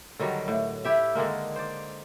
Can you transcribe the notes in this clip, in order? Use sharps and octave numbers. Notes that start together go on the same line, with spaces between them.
D3 D#3 F#3 G3
A2
E4 G4 E5
D3 D#3 G#3 A#3
C5 D5